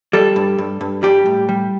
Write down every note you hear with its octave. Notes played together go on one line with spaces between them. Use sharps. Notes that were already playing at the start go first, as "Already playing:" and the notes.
G3 A4
G2
G2
G2
G3 G4
A2
G3